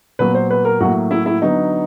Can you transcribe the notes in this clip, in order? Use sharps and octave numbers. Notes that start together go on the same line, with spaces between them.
A#2 F#3 B3 B4
C5
B4
A#4
A2 F#3 A#3 F#4
E4
E4
D3 F#3 B3 D#4